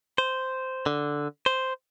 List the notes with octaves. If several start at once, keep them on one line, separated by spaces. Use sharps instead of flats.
C5
D3
C5